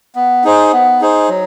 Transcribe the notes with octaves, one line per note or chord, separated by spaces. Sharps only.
B3
D#4 G#4 C5
B3
D#4 G#4 C5
F#3